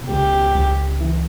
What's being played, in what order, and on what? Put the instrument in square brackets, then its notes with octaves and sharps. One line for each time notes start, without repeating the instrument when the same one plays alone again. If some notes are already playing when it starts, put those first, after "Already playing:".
Already playing: [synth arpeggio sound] B2
[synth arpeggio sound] C#2 [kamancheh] G4
[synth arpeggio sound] C#2
E3